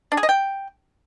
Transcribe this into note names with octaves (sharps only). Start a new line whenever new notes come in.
D4
G#4
D#5
G5